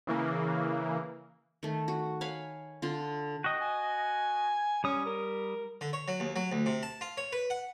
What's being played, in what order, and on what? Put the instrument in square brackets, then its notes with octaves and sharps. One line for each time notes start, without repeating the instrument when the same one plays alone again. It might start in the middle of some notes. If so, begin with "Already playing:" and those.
[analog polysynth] C#3 E3 A#3
[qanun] D#3 A3
F#4
C#5 F5 G#5 B5
D3 F4
[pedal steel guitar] F#4 D#5 [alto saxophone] G5
[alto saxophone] G#5
[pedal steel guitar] G3 D#6 [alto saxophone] C#4
[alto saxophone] A#4
[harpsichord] D3
C#5
F#3
D#2
F#3
D2
C3
A5
F4
C#5
B4
F#5